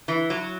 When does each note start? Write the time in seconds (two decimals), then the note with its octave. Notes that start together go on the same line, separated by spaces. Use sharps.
0.08 E3
0.30 F#3